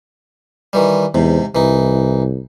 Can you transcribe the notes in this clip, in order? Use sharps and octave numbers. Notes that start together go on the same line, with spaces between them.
D#3 E3 G3
E2 G#2 C3
C2 E3 D#4